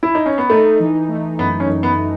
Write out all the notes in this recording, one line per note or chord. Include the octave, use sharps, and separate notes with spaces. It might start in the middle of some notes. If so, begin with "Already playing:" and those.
E4
D#4
C#4
B3
A3 D#4
E3
A3
F#2 B3
C#4
F#2
B3